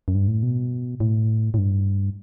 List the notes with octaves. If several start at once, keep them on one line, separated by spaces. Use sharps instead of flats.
F#2
G2
A2
B2
A2
A2
G2